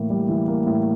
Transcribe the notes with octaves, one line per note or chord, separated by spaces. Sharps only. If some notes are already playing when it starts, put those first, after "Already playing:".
Already playing: A2 E3 A#3
G3
E3
A#3
A2